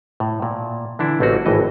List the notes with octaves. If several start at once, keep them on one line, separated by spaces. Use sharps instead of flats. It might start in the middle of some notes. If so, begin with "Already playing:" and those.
A2
A#2
D3 E3 D4 E4
A1 A3 A#3 C4 F#4
G#1 A2 E3 D#5